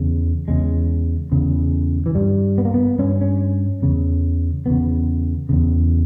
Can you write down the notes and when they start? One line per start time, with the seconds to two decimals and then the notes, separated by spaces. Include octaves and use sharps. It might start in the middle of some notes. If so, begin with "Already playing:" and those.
Already playing: E2 C#3
0.48 E2 C#3 G#3
1.32 E2 C#3
2.06 E3
2.15 G2 G3
2.58 B3
2.65 A#3
2.74 B3
2.99 G2 C#4
3.21 C#4
3.82 E2 C#3
4.66 E2 C#3 B3
5.49 E2 C#3